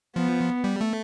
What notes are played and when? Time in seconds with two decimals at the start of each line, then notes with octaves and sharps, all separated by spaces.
0.16 F3 B3
0.64 G3
0.81 A3